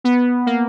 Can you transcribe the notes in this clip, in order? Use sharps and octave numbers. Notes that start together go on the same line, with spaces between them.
B3
A#3